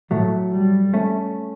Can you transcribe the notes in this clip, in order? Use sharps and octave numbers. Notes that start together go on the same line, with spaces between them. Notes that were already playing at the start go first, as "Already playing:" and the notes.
A2 F#3 A3
G3
A3 C#4